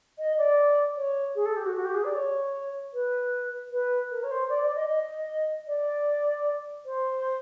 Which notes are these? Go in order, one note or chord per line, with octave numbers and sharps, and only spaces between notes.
D#5
D5
C#5
G#4
A4
G4
F#4
F#4
G4
G#4
D5
C#5
B4
B4
A#4
C#5
C5
D5
D5
D#5
D#5
D5
C5